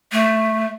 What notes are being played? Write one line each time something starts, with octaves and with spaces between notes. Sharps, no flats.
A3